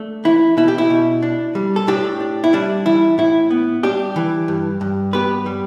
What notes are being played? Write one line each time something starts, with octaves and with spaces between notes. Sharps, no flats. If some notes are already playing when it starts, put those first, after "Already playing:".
Already playing: A3 D4
E3 E4
B2 E4
G4
E4
B2
D4
G3
A4
A2 D4 G4
D4
E4
G3 D4
E3 E4
A2 E4
B3
G3 D4 G4
E3
G2
G2
B3 G4 B4
G3